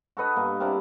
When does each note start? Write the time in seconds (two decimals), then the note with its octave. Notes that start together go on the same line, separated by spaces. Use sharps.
0.17 F#4 A4 B4 D#5
0.36 G2 B2 A#3
0.60 C3 A#3 D4 E4